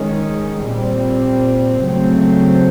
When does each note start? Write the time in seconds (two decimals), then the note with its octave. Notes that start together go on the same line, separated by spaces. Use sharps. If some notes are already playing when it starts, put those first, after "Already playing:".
Already playing: D#3 G#3 C#4
0.64 A#2 G3 C4
1.82 C#3 F#3 A3 C4